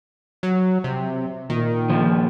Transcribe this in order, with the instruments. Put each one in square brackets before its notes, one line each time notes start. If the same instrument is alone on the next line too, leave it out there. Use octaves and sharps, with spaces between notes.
[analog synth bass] F#3
C3
[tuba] A#2 [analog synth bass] D#3
[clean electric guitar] D#2 F3